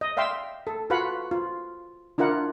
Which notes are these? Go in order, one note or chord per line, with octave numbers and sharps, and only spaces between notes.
D#5
D5 E5 F5 G5 C6 E6
A4
F4 F#4 B4 F5 F#5 B5
F4
D4 E4 F4 A#4 F#5